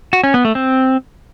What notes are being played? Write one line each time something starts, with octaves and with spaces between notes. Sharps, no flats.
F#4
C#4
B3
A3
C4